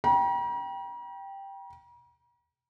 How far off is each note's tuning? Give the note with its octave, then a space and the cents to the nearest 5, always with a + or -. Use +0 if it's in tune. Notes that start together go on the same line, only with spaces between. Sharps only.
G5 +0 A#5 +45